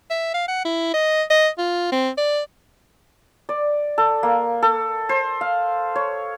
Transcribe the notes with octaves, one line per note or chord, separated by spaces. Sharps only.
E5
F5
F#5
E4
D#5
D#5
F4
C4
D5
D5
A4
A#3
A4
C5
F5
C#5